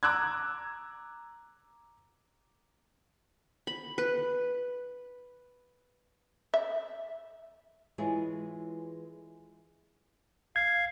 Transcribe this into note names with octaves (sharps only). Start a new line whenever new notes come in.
A#5 D6 E6 F#6 G#6
B5
B4
E5
E3 G#3 F4 G#4 B4 C#5
F5 G#6